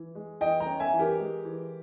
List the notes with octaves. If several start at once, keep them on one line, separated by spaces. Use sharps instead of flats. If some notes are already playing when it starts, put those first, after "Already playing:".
Already playing: E3
G#3
E3 D#5 G5
G5 A#5
C#4
E5 G#5
E3
G4 A#4
G#3
E3